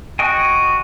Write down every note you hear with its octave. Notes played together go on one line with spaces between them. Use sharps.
F#4 D#5 G5 G#5